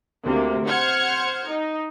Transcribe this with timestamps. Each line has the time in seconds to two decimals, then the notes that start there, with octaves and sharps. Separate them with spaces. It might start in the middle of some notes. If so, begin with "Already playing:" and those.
0.24 D2 C3 A#3
0.67 C5 F#5 F6 G#6 C#7
1.47 D#4